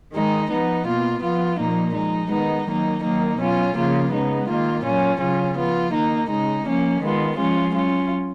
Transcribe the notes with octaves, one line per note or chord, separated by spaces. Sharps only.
D#3 G#3 D#4
F3 B3 D#4
B2 A#3 F4
F3 B3 F4
A#2 F3 A#3 D#4
F3 G#3 D#4
D#3 G#3 B3 D#4
D#3 F#3 A#3 D#4
D#3 F#3 A#3 D#4
B2 F#3 C#4 F4
C#3 F3 A#3 F4
C#3 G#3 B3 D#4
D#3 A#3 F4
A#2 F#3 C#4 F4
C#3 F#3 C#4 F4
F3 B3 F4
D#3 A#3 D#4
C#3 G#3 D#4
F3 A#3 C#4
D#3 G#3 B3 F4
F3 G#3 C#4 F4
F#3 C#4 F4